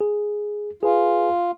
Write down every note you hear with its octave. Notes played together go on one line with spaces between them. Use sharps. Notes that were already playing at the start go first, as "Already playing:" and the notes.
G#4
F4 G#4 B4 G#5